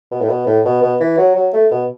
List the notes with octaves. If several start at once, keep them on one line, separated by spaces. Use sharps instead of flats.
B2
A2
B2
A2
B2
B2
E3
F#3
F#3
A3
B2